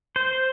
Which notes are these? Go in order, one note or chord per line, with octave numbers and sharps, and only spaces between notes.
C5